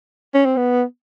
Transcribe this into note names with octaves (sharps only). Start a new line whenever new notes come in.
C#4
C4
B3